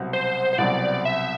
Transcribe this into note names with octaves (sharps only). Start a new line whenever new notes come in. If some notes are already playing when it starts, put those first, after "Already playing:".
Already playing: C2 B2 F#3 C4
C5
C5
C2 B2 F#3 C4 D5
E5